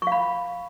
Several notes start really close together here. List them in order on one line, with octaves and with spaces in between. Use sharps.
C#6 F5 B5